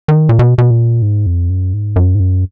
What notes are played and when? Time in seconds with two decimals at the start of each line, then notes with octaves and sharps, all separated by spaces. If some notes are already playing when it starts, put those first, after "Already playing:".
0.08 D#3
0.29 A#2
0.39 B2
0.58 B2
0.71 A#2
1.02 G#2
1.26 F2
1.50 F#2
1.73 G#2
1.96 F#2
2.15 G#2
2.20 F#2